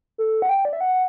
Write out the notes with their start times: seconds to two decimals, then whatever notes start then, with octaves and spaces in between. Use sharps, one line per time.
0.18 A4
0.42 F#5
0.49 G5
0.65 D5
0.73 E5
0.81 F#5